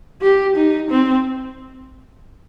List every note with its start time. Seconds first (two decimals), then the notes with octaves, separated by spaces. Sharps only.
0.22 G4
0.56 D#4
0.90 C4